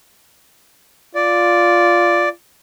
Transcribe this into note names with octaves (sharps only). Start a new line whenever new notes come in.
F4 D5